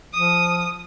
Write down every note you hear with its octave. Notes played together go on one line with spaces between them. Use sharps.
F3 D#6